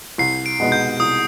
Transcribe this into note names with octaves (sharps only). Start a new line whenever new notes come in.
C2 C7
D7
B2 G#3 B3 D#4
G6
C2 D#6